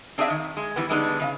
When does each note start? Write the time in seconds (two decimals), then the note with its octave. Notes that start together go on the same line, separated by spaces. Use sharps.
0.18 C4 D4 G#4 B4 E5 F5
0.30 D#3
0.57 G#3
0.76 E3 G3 B3
0.89 D3 G3 G#3 B3 D4 D#4
1.20 C#3 D#5 F5